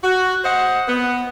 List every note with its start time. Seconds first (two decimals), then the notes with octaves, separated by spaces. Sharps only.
0.03 F#4
0.44 C5 D#5 F#5
0.88 B3